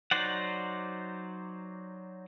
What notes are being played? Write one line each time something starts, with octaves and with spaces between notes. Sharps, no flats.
F#3 D#4 C5 D5 F#5